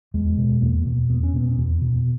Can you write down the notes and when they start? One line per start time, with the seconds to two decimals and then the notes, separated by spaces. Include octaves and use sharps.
0.14 E2 G#3
0.38 B2
0.61 E2 A#3
0.86 B2
1.09 E2 B3
1.23 C#4
1.34 B2 B3
1.57 E2
1.82 B2